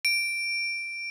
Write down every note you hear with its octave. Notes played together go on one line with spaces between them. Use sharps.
D7